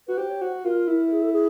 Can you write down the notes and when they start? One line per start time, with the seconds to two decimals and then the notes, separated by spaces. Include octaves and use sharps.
0.07 F#4 B4
0.17 G4 C5
0.29 C#5
0.41 F#4 C5
0.65 F4 A#4
0.87 E4
1.11 G#4
1.22 A4
1.33 G#4